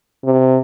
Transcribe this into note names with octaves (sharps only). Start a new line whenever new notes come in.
C3